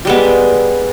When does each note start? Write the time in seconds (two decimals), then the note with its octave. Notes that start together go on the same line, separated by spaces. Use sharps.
0.05 G3 G#3 B3